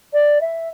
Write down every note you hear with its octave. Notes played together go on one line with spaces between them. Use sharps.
D5
E5